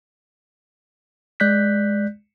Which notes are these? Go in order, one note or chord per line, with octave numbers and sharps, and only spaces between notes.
G#3 D5 F#6 G6 B6